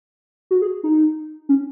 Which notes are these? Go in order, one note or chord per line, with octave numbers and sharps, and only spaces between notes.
F#4
G#4
D#4
C#4